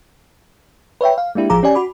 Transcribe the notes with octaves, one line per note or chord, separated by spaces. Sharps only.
B4 C#5 E5 G5
F5
G#3 A#3 D4 E4 G4
A1 F3 F4 G#4 A#5 D6
C#4 G4 D5 G#5
F#4 B5 D6